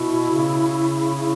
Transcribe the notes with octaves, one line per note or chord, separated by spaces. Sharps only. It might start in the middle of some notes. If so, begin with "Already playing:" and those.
Already playing: B2 E4
C#3
E4